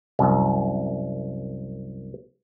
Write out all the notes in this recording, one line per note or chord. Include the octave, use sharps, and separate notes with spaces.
C2 F#2